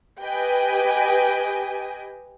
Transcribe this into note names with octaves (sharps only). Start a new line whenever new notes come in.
G4 B4 D#5 G5 G#5